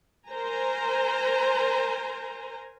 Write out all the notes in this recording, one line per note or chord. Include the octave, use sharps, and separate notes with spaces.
A#4 C5 G#5 A#5